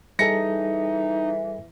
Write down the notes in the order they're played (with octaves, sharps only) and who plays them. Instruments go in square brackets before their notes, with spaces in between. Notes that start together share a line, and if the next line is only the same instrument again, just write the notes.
[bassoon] E3 [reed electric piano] G3 G#4 A4 [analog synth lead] D#4 [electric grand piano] A#6 C#7